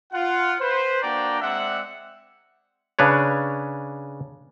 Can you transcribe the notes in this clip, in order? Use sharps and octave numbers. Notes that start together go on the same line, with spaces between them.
F4 F#5
B4 C5
A#3 D4 F#4 D5 G5 A#5
G#3 C4 D5 E5 F#5
C#3 D4 B4 C#5